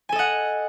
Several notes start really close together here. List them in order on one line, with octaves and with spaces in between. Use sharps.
G#5 A4 D#5 F#5